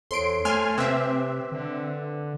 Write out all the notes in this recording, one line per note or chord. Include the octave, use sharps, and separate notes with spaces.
E2 A4 C5 C#5 C6 D7
A3 G#5 C6 F6
C3 C4 B4 E5 D6 F#6
D3